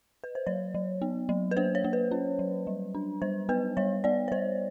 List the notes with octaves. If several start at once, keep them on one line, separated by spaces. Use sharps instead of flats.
B4
C5
F#3 C#5
F#3
B3
F#3
B4
A#3 C5
C#5
A#3
B4
C#4
F#3
G3
D4
G3 C5
B3 B4
G3 C#5
B3 D5
C#5
G3 C5